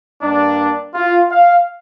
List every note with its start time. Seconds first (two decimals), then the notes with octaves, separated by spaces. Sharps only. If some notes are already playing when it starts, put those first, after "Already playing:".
0.22 G2 G3 A#3 D4
0.95 F4
1.30 F5